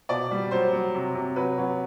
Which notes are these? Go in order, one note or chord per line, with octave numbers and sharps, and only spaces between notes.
B2 D5
G3
F#3 C5
F#3
C3
C3
F#3 B4
F#3